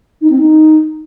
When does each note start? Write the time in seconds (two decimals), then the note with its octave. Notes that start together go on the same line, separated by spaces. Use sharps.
0.21 D#4
0.30 C4
0.39 D#4